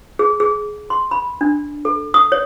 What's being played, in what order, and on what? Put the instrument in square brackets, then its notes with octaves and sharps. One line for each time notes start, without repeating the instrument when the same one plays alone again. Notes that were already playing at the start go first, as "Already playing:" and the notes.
[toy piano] G#4
G#4
C6
B5
D4
A4
D#6
C#5